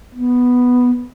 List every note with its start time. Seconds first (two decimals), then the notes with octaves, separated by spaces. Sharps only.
0.15 B3